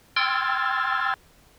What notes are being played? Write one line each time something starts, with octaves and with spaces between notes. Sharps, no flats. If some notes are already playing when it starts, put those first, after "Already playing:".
G5 C6 E6 F6 G#6 A6